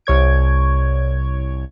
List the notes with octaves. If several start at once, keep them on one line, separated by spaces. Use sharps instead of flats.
C2 C#5 G#6 D7